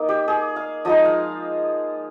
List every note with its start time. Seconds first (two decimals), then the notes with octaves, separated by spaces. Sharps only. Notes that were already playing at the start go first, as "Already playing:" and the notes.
Already playing: A#3 D#4
0.09 G4
0.28 G#4
0.56 F5
0.85 F3 G#3 D#4 D#5
1.05 F5